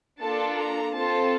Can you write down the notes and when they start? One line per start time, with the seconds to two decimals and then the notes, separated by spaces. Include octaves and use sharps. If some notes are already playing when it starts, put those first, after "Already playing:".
0.21 A#3 D4 F4 A4 A5
0.59 A#5
0.95 C4 F4 A4 A5